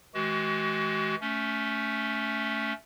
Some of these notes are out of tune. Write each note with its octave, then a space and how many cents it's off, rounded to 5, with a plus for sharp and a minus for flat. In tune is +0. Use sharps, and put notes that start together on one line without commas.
E3 -35 G#3 +30 F#4 +40
A3 +0 C#4 +20